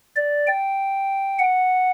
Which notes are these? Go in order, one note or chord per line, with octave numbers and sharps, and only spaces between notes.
D5
G5
F#5